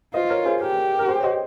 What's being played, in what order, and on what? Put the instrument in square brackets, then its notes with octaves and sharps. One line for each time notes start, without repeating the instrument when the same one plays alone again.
[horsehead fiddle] F4 [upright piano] C5 D#5
[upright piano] A#4 C#5
G#4 C5
[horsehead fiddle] G4 [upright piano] A#4
[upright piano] A#4
G#4 C5
C#5
C5 D#5